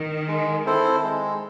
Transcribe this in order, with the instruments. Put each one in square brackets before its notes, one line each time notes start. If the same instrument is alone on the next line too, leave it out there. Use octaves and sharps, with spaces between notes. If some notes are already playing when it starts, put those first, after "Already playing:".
Already playing: [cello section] D#3
[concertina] G#3
C4 E4 A4 C5
G#3